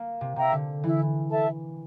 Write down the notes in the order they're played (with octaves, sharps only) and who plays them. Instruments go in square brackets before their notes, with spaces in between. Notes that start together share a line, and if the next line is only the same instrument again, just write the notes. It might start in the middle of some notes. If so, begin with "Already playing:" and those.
Already playing: [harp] A#3
C3
[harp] C3 [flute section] E5 G5 A#5
[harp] D3
[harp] E3 [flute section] E4
[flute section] A4 E5 A5